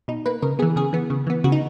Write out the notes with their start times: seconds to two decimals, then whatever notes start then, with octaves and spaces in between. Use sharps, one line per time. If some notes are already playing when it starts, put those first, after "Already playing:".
0.08 B2 D#4
0.26 A#3 B4
0.42 C#3 A#4
0.59 B3 G#4
0.62 E3
0.76 C#3 G#4
0.93 E3 B3
1.10 C#3
1.27 E3 B3
1.44 C#3 F#4
1.52 D#4